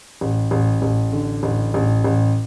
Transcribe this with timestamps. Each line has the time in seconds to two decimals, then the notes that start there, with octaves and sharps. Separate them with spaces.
0.21 A1
0.51 A1
0.82 A1
1.13 D3
1.43 A1
1.74 A1
2.04 A1